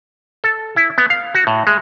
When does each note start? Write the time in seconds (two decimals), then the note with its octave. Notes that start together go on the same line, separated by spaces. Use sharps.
0.44 A4
0.76 E4
0.98 B3
1.10 F5
1.35 F#4
1.47 A2
1.67 G#3